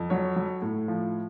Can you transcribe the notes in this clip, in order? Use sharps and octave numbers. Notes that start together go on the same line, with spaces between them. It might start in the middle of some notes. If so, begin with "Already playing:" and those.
Already playing: F2
F#3 C#5
F#3
A2
F3